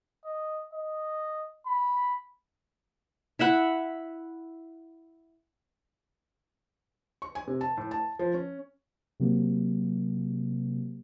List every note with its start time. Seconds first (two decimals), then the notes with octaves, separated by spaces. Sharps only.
0.25 D#5
0.73 D#5
1.67 B5
3.39 E4 E5 F#5 B5
7.22 C#6
7.35 G#5
7.47 C3
7.61 A5
7.77 A2
7.91 A5
8.19 F3
8.34 C#4
9.20 C3 F#3 A#3